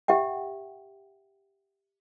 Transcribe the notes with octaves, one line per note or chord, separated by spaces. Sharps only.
G4 E5 F#5 G5